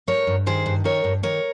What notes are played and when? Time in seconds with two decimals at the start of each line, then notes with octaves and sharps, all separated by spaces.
0.07 G2 A#4 C#5
0.27 G2
0.46 D#3 G#4 C5
0.66 G2
0.84 D#3 A#4 C#5
1.04 G2
1.23 D#3 A#4 C#5